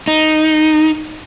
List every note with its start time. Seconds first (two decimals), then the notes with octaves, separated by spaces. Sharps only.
0.08 D#4